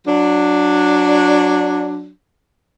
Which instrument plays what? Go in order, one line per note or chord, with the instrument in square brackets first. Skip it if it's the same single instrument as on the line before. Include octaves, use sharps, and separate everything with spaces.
[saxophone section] F#3 D4